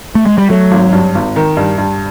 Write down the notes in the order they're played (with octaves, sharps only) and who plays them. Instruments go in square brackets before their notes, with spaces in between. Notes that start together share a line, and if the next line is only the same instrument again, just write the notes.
[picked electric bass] A3
G#3
G3
[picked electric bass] F#3 [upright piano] A3
[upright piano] G#1
G2
G#1
D#3
G2
G2